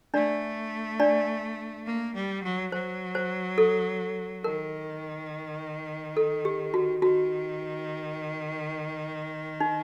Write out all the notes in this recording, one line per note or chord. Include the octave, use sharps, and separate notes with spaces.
A3 D4 D5
D4 D5
A#3
G3
F#3
F#3 C5
C5
A4
D#3 A#4
A4
G4
F#4
D#3 F#4
D#4